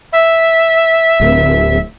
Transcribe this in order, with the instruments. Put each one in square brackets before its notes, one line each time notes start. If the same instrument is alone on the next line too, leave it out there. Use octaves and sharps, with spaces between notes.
[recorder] E5
[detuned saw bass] D1